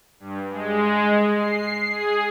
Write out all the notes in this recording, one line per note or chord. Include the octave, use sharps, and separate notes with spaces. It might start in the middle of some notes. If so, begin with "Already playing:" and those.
G2
G#3
C7
G#4